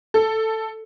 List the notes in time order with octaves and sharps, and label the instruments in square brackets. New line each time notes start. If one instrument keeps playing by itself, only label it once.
[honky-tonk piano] A4